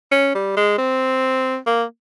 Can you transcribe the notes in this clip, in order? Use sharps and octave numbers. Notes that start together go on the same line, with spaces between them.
C#4
G3
G#3
C4
A#3